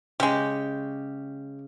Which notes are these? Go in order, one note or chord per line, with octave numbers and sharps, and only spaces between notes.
C#3 G#3 G4 G5